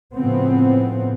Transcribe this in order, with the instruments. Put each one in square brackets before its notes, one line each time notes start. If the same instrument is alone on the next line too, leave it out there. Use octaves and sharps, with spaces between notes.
[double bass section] A2 C#3 F3 B3 C4